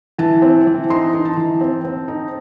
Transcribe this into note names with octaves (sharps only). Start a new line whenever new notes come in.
E3 A5
C4
E3
D#4 C6
D#4
A5
E3
C4
C4
D#4